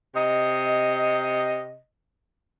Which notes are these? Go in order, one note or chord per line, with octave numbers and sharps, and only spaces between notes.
C3 D#5